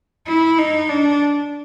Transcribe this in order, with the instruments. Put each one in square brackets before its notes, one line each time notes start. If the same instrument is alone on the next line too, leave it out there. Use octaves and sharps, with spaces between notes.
[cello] E4
D#4
D4